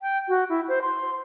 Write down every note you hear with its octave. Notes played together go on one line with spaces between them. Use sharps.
G5
F#4
E4
C5
C6